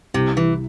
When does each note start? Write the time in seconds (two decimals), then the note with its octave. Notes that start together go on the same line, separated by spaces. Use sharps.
0.14 C2 C3
0.37 E3